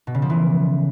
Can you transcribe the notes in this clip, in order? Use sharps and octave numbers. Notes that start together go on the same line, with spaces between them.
B2
C#3
F3
E3